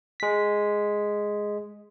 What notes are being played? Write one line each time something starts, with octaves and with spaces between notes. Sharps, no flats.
G#3 B6